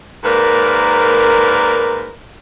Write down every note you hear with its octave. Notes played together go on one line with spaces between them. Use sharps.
G#2 A#3 A#4 B4 D5